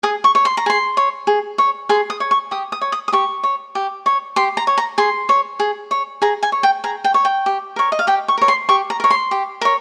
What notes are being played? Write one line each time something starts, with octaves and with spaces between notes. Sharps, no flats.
G#4 D#6
C#6
C#5
C6
A#5
G#4 C6
C#5
G#4
C#5
G#4 C6
D#6
C#5
C#6
G4 D#6
D#6
C#5
D#6
D#6
G4 C#6
C#5
G4
C#5
G4 C6
A#5
C#5
A#5
G#4 C6
C#5
G#4
C#5
G#4 A#5
G#5
C#5
G5
G#4 A#5
G5
C#5
G5
G4
A#4 C#5
D#5
F5
G4 G5
C#6
A#4 C#5
C6
G4 C#6
A#5
A#4 C#5
C6
G4
A#4 C#5